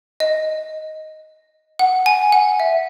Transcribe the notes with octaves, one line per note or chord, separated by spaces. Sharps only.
D#5
F#5
G#5
F#5
E5